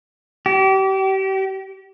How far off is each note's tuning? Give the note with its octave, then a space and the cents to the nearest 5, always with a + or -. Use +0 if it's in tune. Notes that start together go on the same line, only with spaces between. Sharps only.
G4 -30